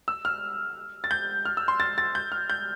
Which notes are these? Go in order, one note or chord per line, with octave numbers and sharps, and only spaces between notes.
E6
F6
A6
G6
F6
E6
C6
A6
A6
G6
F6
G6